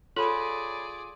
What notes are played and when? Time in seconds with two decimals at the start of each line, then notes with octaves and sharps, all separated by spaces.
0.17 F4 G#4 A4 C#5 D5 B5